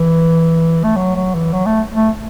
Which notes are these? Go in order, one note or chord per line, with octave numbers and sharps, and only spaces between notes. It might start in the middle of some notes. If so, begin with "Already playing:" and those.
Already playing: E3
A3
F#3
F#3
E3
F#3
A3
A3